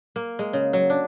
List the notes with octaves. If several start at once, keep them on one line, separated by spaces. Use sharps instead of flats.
A#3
G#3
C#3
F#3
D4